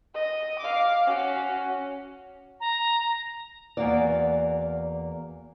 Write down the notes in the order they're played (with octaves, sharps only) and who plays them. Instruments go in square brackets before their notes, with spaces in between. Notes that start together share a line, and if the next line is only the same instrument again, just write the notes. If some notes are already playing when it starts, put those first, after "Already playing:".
[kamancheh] D#5
F5 D6
C#4 F#4
[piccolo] A#5
[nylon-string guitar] E2 A#3 F#4 D5